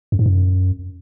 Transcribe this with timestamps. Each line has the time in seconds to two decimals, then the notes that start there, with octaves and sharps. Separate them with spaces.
0.12 F#2
0.19 G#2
0.26 F#2